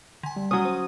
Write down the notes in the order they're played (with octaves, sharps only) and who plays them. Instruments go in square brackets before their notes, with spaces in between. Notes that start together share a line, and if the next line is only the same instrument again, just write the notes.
[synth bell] D3 G#5
[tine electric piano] G3
[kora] F#3 C#4 [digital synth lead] D#6
[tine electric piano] C5